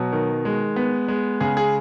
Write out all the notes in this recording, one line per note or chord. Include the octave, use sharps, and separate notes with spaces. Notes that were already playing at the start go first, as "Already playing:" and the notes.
Already playing: B2 F#3
D#3
G#3
B3
G#3
C#3 G#4
G#4